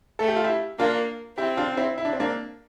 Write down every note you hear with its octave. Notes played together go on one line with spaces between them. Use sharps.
A3 A4
G4
F4
E4 G4
A#3 D4 F4
C4 E4 G4
D4 F4
C4 E4
E4
D4
C4
A#3 D4